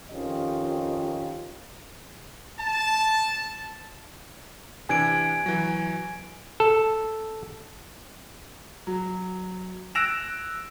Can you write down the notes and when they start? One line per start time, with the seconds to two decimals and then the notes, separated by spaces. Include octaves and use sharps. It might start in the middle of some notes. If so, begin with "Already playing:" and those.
0.12 F2 D#3 C#4 F4 G4 D#5
2.60 A5
4.89 C3 E3 D4 G#5 G#6 D7
5.46 E3 F#3
6.60 A4
8.87 F#3
9.95 E6 F#6 A#6 D7 E7 F7